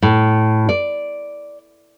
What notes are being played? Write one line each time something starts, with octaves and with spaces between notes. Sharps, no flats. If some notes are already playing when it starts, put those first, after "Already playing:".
A2
D5